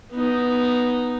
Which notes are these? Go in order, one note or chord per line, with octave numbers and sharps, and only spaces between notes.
B3 D#4